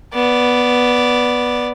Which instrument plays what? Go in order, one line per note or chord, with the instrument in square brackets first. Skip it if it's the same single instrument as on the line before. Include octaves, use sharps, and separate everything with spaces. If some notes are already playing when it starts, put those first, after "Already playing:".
[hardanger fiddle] B3 D5